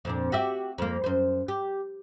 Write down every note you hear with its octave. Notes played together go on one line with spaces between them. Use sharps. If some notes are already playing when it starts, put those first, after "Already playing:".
F2 A#2 D4
F#4 G4 E5
F2 A#3
F#2 C5
G4